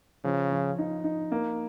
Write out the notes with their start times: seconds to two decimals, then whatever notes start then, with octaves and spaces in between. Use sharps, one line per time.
0.24 C#3 F3
0.52 F3
0.78 D#4
1.04 D#4
1.32 A#3